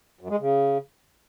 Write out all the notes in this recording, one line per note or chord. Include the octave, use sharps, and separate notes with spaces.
F#2
G#3
C#3